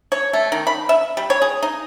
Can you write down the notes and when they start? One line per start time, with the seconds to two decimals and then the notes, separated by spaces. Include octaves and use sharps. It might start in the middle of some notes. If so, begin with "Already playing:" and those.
0.12 C#5
0.33 A3
0.52 D#3
0.67 B5
0.89 E5
1.17 G3
1.30 C#5
1.42 G#4
1.63 D#4